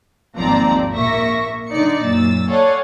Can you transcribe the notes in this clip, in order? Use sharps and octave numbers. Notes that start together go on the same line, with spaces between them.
G#1 D#2 F3 C4 D5 A#5
A#1 A#3 E5 C#6 A#6
D3 D#4 D5 C#7
F#2 A#2 E6 A6
A4 C#5 D5 F5 F#5 G#5